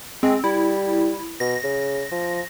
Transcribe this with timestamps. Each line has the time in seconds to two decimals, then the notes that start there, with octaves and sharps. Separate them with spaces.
0.23 G#3 C4
0.44 G3 E4
1.40 B2 A#6
1.64 C#3
2.12 F3